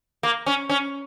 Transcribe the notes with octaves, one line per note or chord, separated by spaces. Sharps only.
A#3
C#4
C#4